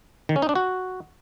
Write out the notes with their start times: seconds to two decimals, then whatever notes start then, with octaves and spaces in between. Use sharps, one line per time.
0.29 D#3
0.36 C#4
0.42 D#4
0.49 D4
0.55 F#4